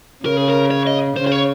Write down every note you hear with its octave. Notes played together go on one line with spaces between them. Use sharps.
C#3 A#4
G#4
A#4
C#5
D#5
C#3 C5
C5
C#5